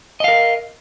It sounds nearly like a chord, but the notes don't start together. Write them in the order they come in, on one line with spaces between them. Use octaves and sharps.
D#5 F5 A#4